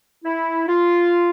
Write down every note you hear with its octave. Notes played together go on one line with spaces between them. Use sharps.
E4
F4